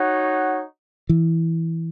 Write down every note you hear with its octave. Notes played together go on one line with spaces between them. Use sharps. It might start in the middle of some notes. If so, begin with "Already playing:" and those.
Already playing: D#4 F#4 C#5 F#5
E3